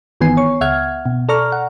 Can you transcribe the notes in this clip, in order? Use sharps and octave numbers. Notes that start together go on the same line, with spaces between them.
G1 D#3 E3 B3 G#5 C7
C#5 C#6
C#2 E5 F#5 F6 G#6
B2
A4 D5 A#5 C#6 F6
F#5